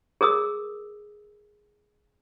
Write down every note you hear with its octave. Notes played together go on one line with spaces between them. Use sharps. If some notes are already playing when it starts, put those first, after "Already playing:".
G#4 A#4 D#6 E6